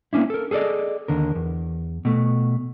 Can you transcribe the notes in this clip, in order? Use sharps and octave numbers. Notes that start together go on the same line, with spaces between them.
A#3 B3 C#4 D4 E4
A4 A#4
G#4 A4 B4 D5 D#5
D#2 D3 A#4
E2
B2 A3